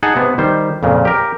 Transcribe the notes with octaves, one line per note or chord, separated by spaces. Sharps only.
D#4 G#4 F#5 G#5 A5
C3 B3
D#3 G3 C5
F2 A#2 C#3
G4 A#4